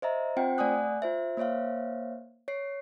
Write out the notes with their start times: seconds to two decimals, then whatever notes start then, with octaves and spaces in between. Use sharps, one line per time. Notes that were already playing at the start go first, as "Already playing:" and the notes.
0.02 C5 D#5 E5 A#5
0.37 C4 F4 C5 F#5 G5
0.58 A3 D5 F#5 G#5 D#6 F#6
1.02 F4 C5 E5
1.37 A#3 C5 C#5 E5 F5
2.48 C#5 C7